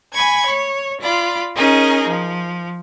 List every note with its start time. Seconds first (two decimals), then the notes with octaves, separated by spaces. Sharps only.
0.12 G#5 B5 C#6 G#6
0.46 C#5
1.00 F4 D5 B5
1.54 C#4 D#4 G#4 A#4
2.06 F3